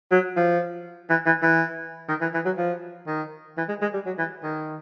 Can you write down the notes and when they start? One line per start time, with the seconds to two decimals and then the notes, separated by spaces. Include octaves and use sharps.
0.11 F#3
0.37 F3
1.10 E3
1.26 E3
1.43 E3
2.09 D#3
2.22 E3
2.34 E3
2.45 F#3
2.58 F3
3.07 D#3
3.57 E3
3.69 G#3
3.82 G#3
3.94 G3
4.06 F#3
4.18 E3
4.43 D#3